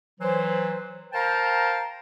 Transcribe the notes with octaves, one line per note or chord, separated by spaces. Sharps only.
E3 F#3 C5
A#4 C5 F5 G5 A5 A#5